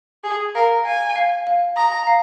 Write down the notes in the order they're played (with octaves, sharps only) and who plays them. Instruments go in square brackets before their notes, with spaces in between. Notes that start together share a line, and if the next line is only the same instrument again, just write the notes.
[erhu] G#4 [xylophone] G#5
[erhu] A#4 [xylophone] F5
[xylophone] F5 [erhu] G#5
[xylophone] F5
F5
[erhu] A#5 [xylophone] D#6
[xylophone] F5